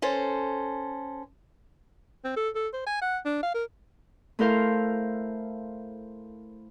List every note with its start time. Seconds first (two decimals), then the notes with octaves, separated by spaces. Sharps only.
0.02 C#4 A4 C5
2.25 C4
2.36 A4
2.55 A4
2.73 C5
2.86 G#5
3.02 F#5
3.25 D4
3.43 F5
3.54 A#4
4.39 A3 E4 A4 A#4 C5 F5